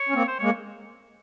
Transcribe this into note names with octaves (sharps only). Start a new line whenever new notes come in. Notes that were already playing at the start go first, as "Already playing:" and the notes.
Already playing: C#5
C#4
A#3 C4
C5
G#3 A#3 C#5